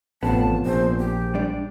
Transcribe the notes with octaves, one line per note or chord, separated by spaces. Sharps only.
A1 C3 F3 B3 A5
A#1 C5
G4
G3 D4 D5